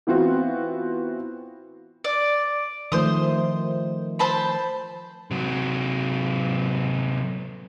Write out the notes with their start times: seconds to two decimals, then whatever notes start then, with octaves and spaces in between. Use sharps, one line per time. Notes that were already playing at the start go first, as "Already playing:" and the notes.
0.07 E3 B3 C4 F4 F#4
2.04 D5
2.92 D#3 F3 A3 C5 C6 D#6
4.19 C5 A5 B5
5.31 C3 F#3